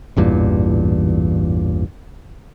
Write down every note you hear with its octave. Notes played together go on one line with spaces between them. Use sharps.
A1 E2 G2 A#2